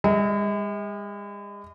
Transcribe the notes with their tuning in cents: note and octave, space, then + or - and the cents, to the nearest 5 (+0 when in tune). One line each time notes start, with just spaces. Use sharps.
G#3 -45 D#5 +40